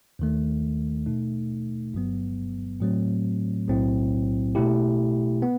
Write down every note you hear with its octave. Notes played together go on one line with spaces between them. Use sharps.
D#2 D#3 A3
B2 A3 D#4
G1 G2 F#3 B3
A2 F#3 A3 C4
B1 A2 F#3 C4 E4
B2 A3 E4 G4
B3